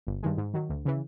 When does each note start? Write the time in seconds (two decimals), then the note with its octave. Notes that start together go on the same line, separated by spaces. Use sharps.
0.07 G1
0.23 G2 D#3 G#3
0.37 G#2
0.54 D#3 F#3
0.69 D2
0.85 C#3 E3